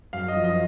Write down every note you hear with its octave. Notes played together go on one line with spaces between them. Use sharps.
F#2 F5
D#5
F3
D#5